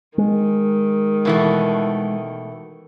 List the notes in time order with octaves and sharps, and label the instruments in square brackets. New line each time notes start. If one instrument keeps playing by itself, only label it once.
[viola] D#3 [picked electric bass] G#3
[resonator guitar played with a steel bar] B2 E3 A3